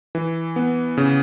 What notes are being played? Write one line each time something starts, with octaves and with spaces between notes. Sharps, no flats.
E3
B3
C#3